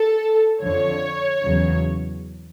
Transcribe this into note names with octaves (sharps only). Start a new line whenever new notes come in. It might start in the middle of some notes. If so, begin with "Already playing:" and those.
Already playing: A4
F2 D3 F3 C#5
E2 C#3 F#3